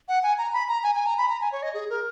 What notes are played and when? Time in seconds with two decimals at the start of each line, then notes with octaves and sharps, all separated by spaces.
0.08 F#5
0.23 G#5
0.38 A#5
0.53 B5
0.68 A#5
0.83 G#5
0.95 G#5
1.06 A#5
1.18 B5
1.29 A#5
1.41 G#5
1.52 C#5
1.63 D#5
1.74 G#4
1.90 A#4